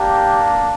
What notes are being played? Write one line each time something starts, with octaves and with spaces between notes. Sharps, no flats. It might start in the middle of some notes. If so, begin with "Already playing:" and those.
Already playing: A#3 D4 G4